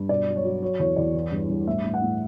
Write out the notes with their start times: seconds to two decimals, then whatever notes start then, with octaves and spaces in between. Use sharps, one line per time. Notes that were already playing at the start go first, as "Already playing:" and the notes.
Already playing: G2
0.09 B2 D5
0.28 F#3
0.36 C#5
0.44 F#3
0.62 F#3 C#5
0.79 E2 C#5
0.96 E2 D5
1.14 E3
1.32 G2
1.50 G2
1.67 A2 E5
1.85 A2
1.94 F#5
2.02 A2